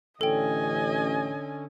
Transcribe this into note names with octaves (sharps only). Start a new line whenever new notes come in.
A1 D3 C#4 A4 D#5 G5 G#5